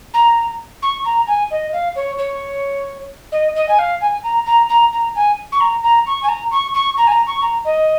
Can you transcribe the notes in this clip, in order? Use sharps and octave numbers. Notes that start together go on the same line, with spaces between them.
A#5
C#6
A#5
G#5
D#5
F5
C#5
C#5
D#5
D#5
G#5
F5
G#5
A#5
A#5
A#5
A#5
G#5
C#6
A#5
A#5
C#6
G#5
A#5
C#6
C#6
A#5
G#5
A#5
C#6
A#5
D#5